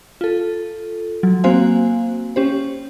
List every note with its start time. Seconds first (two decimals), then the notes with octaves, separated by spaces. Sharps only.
0.21 F4 A4
1.23 F#3
1.44 A#3 C4 F#4 C5 F5 G#5
2.36 C#4 G4 C5